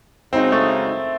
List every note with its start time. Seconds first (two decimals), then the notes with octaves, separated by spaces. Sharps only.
0.32 C#3 G#3 C4 D#4 F#4
0.52 A3